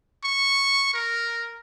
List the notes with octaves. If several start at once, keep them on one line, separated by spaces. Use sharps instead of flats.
C#6
A#4